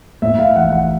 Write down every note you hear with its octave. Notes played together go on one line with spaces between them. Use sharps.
A2 E5
F5
A1 F#5
F#5